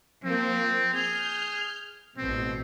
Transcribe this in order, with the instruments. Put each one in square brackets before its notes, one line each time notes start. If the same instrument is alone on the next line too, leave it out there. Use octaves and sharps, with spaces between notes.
[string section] F3 A#3 [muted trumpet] C4
[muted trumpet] G#4 [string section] F6 G6
[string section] A1 B2 [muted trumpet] C4